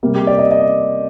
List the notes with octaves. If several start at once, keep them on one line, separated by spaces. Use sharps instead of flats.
C3 G3 A#3
G4
D5
D#5
D#5